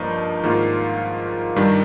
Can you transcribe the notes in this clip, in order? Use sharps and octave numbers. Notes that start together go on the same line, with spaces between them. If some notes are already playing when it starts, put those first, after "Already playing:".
Already playing: G2 F3 A#3 D#4
G#2 D#3 A#3 F4
G2 D#3 G3